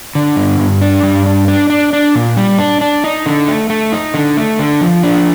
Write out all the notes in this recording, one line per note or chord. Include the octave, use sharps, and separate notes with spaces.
D3
G2
G2
D4
G2
D4
D4
D4
D4
A#2
G3
D4
D4
D#4
D3
A3
A3
D#4
D3
A3
D3
F3
D4